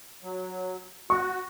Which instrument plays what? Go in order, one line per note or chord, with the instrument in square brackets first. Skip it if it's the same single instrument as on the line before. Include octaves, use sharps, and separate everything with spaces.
[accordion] F#3
[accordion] F#4 [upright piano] C#6